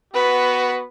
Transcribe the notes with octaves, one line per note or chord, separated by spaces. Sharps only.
B3 F#4 B4